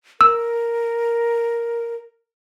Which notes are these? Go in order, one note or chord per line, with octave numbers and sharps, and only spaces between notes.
A#4 E6